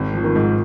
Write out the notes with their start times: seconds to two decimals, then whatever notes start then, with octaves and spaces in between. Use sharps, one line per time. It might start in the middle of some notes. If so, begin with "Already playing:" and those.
Already playing: G#1
0.14 F3
0.24 D#3
0.36 G#2